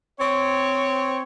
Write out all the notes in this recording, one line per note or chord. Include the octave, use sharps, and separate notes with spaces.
C4 C#5